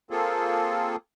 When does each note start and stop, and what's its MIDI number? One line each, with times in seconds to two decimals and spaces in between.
0.11 0.96 58
0.11 0.96 60
0.11 0.96 65
0.11 0.96 68
0.11 0.96 69